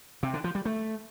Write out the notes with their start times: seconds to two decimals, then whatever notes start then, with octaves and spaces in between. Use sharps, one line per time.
0.23 C3
0.34 D3
0.44 F3
0.55 G3
0.65 A3